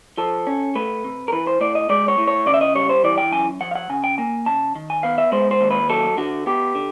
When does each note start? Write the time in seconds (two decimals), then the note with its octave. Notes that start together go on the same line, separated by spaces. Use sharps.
0.17 F3 A4
0.47 C#4
0.75 A3 B4
1.04 C3
1.28 A#4
1.32 E3 B4
1.47 C5
1.61 A2 D5
1.75 D#5
1.89 G#3 D5
2.08 C#5
2.18 A2
2.27 C#5
2.46 C#3 D5
2.54 E5
2.61 D#5
2.75 G3 C#5
2.89 C5
3.04 E3 D5
3.18 G5
3.32 F#2 G#5
3.61 F3 F#5
3.71 F5
3.75 F#5
3.90 C#3 G#5
4.04 G5
4.18 A#3 G#5
4.46 C#3 A5
4.75 D#3
4.90 G#5
5.03 B3 F5
5.18 E5
5.32 G#3 C5
5.51 C5
5.61 D#2
5.71 B4
5.89 F#3 A4
6.17 D3 F#4
6.46 B3 G4
6.75 D3